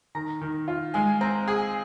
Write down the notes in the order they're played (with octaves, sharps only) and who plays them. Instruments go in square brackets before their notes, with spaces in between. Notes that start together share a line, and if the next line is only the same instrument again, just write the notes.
[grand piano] D#3 [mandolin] A#5
[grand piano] D#3
F4
[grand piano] G#3 [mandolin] G#5
[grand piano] C4 [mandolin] A#5
[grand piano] G#4 [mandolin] G#5